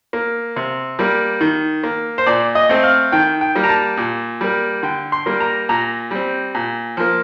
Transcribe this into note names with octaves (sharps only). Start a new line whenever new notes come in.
A#3
C3
G3 A#3
D#3
A#3
C5
A#2 D5
D#5
A3 C4
F5
D#3 G5
G5
G3 A#3
A#5
A5
A#2
G3 A#3
D3 G5
C6
G3 A#3
A#5
A#2 A#5
G3 C4
A#2
F3 A#3